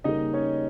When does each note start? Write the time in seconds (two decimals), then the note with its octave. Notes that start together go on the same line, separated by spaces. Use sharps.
0.04 C#3 G3 A#3 D#4 D#5
0.33 C#4 C#5